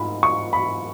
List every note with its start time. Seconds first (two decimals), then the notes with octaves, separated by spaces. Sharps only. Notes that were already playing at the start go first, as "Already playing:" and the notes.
Already playing: G#2 B5
0.23 C#6
0.53 B5